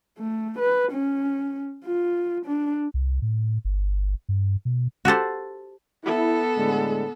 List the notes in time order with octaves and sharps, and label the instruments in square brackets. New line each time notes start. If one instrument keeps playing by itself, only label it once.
[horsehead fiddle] A3
B4
C#4
F4
D4
[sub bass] C2
A2
G1
G2
B2
[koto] F#4 G4 A4 C5
[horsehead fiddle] B3 A4 [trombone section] E4
[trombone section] A2 D3 G#3